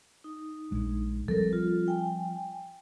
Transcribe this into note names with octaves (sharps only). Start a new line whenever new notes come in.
D#4
A#1 G#3 D4
F3 G3 C4 A4 A#4
F4
G5 G#5